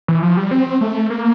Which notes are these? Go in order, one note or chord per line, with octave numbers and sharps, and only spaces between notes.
E3
F3
G3
C4
A3
A#3